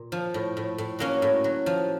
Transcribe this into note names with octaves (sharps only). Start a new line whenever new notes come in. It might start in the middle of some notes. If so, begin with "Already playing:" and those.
Already playing: A#2
F3
A2
A2
A2
F#3 A#3 C#4
A2
F#3
F3